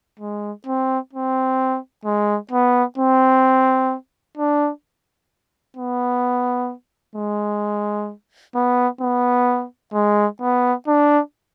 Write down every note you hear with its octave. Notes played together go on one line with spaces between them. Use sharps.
G#3
C4
C4
G#3
B3
C4
D4
B3
G#3
B3
B3
G#3
B3
D4